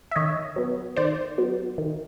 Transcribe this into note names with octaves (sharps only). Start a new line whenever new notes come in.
E5
D#3 C#5 D#5
F#3 B3
D#3 C5 D5
F#3 B3
D#3